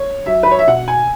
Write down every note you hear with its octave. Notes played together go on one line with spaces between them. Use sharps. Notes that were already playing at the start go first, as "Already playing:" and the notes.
Already playing: C#5
F#3 E5
B4
C#5
E5
B2 F#5
G#5